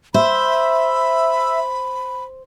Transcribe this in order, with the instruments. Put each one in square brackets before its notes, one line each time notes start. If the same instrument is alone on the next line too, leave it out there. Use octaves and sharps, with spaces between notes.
[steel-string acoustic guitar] C5 [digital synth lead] E5 [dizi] B5